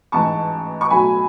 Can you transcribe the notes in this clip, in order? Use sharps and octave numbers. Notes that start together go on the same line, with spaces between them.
A1 G#2 E3 A5 C#6
C#6
B1 A2 F#3 G#5 B5